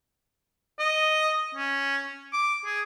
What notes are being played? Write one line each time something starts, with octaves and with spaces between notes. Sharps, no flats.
D#5
C#4
D6
G#4